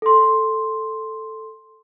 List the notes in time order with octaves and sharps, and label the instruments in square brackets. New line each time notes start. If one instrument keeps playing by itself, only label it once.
[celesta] A4 C6